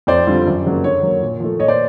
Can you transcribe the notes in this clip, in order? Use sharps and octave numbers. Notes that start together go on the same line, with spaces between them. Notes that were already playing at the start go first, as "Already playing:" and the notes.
F2 C5 D5
D3 G3 C4 F4
F#2
C#3 F#3 A#3
D3 C#5
F#3 A#3
A#2
F3 A3
A#2 C#5 D#5
C5 D5